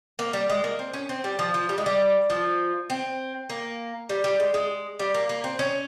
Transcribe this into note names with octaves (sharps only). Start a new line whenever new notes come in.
A#3
G3
G#3
A#3
C4
C#4
C4
G3
F3
F3
G3
G#3
G3
F3
C4
A#3
G3
G3
G#3
G#3
G3
A#3
A#3
C4
C#4